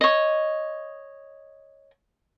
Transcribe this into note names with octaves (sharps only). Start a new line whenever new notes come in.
C#5 D#5